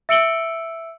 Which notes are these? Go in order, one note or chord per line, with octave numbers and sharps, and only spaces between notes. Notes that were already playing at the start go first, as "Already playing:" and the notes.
E5 E6 C#7 D7 F#7 G7